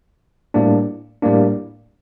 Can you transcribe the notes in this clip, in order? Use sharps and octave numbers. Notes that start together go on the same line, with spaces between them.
A2 G3 A#3 D4
A2 G3 A#3 D4